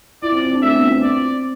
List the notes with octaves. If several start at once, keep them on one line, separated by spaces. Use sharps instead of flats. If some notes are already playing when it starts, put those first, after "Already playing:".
E4 D5
C4
C4
D4
A3 E5
B3
C4
D5